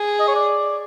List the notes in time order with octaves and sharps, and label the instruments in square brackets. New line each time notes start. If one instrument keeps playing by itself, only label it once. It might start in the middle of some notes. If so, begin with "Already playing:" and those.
Already playing: [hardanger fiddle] G#4
[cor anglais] D#5
C#5
D5